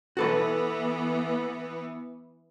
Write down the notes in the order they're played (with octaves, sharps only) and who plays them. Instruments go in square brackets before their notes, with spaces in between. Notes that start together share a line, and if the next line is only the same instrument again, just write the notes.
[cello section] E3 B3 [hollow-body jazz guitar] F#4 A4 B4